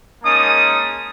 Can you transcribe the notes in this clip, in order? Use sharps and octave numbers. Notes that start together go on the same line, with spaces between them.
G#3 A#3 C#4 D#4 A5 D#6